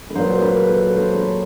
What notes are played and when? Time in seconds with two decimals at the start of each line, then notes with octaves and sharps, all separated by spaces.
0.10 B4
0.15 A#2 F#3 C5
0.42 B4
0.68 A4
0.95 C5
1.14 C#5